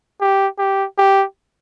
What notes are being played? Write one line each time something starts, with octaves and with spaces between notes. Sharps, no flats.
G4
G4
G4